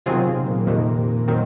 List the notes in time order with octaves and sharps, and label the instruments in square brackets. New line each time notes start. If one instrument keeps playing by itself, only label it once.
[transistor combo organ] C3 [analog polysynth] D#3 F#3 C4 F4 G#4
[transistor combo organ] C3
C3
A#2
[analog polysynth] F2 C3 D#3
D#3 F#3 C4